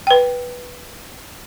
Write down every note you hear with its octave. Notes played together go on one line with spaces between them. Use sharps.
B4 G5